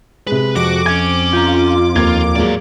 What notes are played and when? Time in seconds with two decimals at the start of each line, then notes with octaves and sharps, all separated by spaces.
0.27 C3 G#3 B4
0.55 F2 F#4 D6
0.86 C#4 G#5 G#6
1.33 F4 A#5 G6
1.96 D#2 A#3 F4 G#6
2.36 G#2 F#3 G#3 A#3 D5